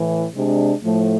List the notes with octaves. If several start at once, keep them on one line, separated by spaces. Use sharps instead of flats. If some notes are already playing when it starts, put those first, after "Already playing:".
Already playing: A2 E3
C3 G#3 D4
A2 F3 A3